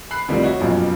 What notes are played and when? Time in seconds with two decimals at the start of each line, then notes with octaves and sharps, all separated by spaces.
0.11 B5 F#6 C7
0.28 D2 C3 D#3 F3 G3
0.42 D#4 F#4 C#5 E5
0.59 F#1 G2 B2 F3 F#3